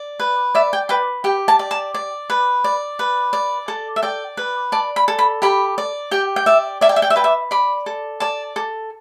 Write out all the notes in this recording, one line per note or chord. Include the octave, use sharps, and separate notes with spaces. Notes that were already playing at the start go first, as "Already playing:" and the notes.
Already playing: D5
B4
D5 E5
G5
B4 G5
G4 G5
A5
D5
A5
D5
B4
D5
B4
D5
A4
E5
D5 G5
B4
D5 A5
B5
A4
B5
G4 B5
D5
G4 G5
G5
D5 E5
D5 E5
G5
E5
G5
E5
B4 G5
E5
D5 B5
A4
D5 A5
A4